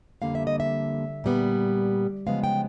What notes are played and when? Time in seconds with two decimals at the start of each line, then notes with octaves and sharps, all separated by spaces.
0.22 F2 D3 G3 A#3 F5
0.35 E5
0.47 D#5
0.60 E5
1.24 A#2 G3 B3
2.27 C#3 F3 G#3 B3 F5
2.44 G5